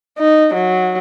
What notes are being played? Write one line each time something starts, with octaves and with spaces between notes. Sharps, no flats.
D#4
F#3